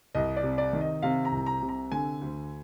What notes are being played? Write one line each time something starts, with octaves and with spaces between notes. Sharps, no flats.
C2 D#5
D5
C3
D5
D#3
D#5
C3 F5
A#5
C2
A#5
C3
A#5
D3 G#5
D2